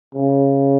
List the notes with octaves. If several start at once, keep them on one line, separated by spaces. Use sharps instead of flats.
C#3